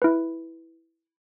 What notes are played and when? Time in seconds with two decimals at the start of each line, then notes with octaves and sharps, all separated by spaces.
0.02 E4 B4